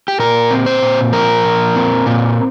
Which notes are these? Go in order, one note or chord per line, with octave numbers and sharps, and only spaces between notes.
G4
A#2 A#4
C4
C5
A#2
F3 A#4
A#2
C4
A#2